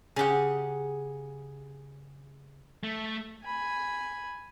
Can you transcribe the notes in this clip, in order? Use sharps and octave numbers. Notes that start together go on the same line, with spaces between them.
C#3 G4 G#4 F#5
A3
G#5 B5